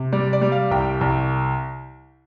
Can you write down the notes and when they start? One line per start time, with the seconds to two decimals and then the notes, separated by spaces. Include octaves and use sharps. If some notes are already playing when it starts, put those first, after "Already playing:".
Already playing: C3
0.12 G3 D5
0.33 D5
0.42 G3
0.52 F5
0.71 C2 G5
1.01 C2